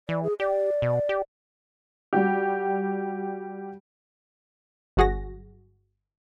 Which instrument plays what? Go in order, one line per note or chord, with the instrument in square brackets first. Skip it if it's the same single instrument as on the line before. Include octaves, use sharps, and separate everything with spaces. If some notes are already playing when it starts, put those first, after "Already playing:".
[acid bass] E3 [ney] D5
[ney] G#4
[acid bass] G4 [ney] D5
[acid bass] B2
G4
[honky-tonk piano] G3 F#4 G4
[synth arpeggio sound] G1 F#3 F#4 G#4 F#5 A#6